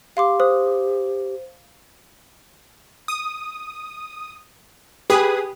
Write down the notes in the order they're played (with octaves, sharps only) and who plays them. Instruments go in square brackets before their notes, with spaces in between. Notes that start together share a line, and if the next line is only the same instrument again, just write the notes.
[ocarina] G4 [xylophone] F5 C6 D6
[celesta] C5 [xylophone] D#6
[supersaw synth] D#6
[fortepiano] G4 [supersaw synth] G#4 B4 D#6